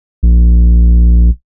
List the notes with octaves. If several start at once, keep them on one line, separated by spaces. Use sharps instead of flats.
A#1